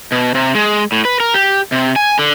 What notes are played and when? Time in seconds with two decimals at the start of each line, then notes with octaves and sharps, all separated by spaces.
0.12 B2
0.35 C3
0.55 G#3
0.92 A2
1.05 B4
1.20 A#4
1.34 G4
1.72 C3
1.96 G#5
2.19 D3